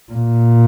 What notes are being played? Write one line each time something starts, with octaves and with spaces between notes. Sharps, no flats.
A#2